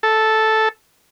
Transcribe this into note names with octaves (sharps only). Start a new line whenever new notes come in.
A4